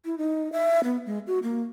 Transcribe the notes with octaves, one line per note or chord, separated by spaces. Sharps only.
E4
D#4
E5
B3
G#3
F#4
A#3